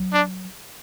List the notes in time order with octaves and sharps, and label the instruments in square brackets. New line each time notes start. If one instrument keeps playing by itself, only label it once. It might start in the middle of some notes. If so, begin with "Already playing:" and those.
Already playing: [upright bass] F#3
[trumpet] D4